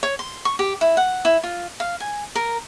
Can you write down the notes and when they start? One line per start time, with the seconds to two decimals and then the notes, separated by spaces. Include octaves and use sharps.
0.03 C#5
0.19 C6
0.45 C#6
0.59 G4
0.81 E4
0.97 F#5
1.25 E4
1.43 F4
1.80 F5
2.00 G#5
2.35 A#4